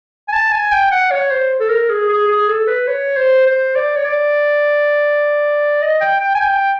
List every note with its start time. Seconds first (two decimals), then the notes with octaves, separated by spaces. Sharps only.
0.28 G#5
0.33 A5
0.52 G#5
0.72 G5
0.91 F#5
1.11 C#5
1.31 C5
1.60 A4
1.69 A#4
1.89 G#4
2.09 G#4
2.28 G#4
2.48 A4
2.67 B4
2.87 C#5
3.17 C5
3.46 C5
3.76 D5
3.97 C#5
4.05 D5
5.82 D#5
6.01 G5
6.20 G5
6.35 G#5
6.41 G5